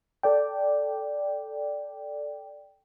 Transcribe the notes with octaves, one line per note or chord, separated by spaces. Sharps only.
A4 D5 G5